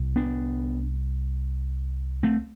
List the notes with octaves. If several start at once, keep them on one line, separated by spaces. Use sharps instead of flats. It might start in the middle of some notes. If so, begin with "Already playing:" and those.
Already playing: C2
B3 D4
A3 C4